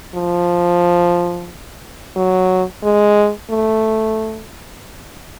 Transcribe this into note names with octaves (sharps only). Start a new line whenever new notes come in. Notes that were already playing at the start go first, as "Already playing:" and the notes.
F3
F#3
G#3
A3